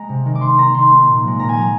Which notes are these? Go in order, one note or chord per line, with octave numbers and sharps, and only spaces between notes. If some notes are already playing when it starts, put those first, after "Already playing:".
Already playing: G#3 A#5
C3
D#3 G#3
D6
D#3 C6
A#3 A#5
D#3 C6
A#3
A#2
F3 G#3
A#2 A#5
G#5
F3 G#3 A#5